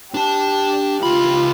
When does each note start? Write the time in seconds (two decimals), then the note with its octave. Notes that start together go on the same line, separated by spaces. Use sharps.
0.14 D4 G4 A5
1.03 C#2 F4 B5